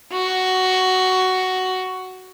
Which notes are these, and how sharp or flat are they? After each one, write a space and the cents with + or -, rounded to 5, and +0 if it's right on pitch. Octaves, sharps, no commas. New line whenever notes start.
F#4 +10